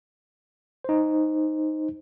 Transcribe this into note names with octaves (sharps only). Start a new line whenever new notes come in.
D#4 C5